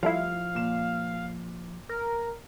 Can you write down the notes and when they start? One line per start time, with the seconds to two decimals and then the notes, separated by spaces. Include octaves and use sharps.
0.03 F3 G3 A3 E4 F5
0.55 A#2 E7
1.89 A#4